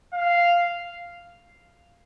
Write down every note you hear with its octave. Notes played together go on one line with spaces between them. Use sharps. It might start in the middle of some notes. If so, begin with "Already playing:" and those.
F5